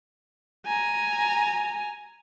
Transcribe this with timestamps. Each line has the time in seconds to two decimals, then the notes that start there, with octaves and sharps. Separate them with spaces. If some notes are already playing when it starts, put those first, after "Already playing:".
0.66 G#5 A#5